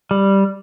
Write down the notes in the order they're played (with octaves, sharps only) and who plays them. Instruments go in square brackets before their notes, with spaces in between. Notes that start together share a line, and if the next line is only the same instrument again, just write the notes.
[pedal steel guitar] G3